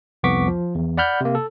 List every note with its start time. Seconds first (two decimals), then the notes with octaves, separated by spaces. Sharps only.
0.23 C2 F2 B3 C#6 D6 B6
0.48 F3
0.75 E2
0.97 D5 F#5 B5 F6 G6
1.21 C3 A#3
1.35 A4